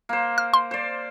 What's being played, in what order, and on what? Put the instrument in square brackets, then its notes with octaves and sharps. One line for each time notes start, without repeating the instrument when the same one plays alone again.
[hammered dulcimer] A#3 C5
[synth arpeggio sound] F6
C6
[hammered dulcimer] C5 D5